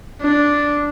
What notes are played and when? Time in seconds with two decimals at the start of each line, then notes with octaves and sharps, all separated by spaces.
0.21 D4